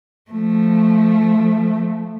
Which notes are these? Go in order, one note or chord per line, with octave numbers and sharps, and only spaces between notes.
F3 A3